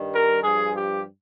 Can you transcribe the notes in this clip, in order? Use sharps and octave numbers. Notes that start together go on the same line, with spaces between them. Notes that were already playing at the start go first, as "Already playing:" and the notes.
Already playing: G2 D#3 G3
A#4
G2 F3 G#4
G4